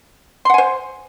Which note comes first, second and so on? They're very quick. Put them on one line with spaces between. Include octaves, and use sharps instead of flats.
C6 F#5 G#5 C5